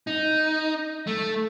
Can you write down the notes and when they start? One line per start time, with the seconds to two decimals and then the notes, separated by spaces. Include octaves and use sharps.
0.07 D#4
1.07 A3